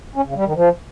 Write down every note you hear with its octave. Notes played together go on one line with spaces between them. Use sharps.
C#4
C#3
G3
D#3
F3